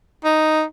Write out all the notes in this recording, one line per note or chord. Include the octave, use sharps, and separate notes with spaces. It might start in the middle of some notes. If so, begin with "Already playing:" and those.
D#4